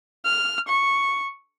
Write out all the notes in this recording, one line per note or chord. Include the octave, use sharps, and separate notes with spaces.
F6
C#6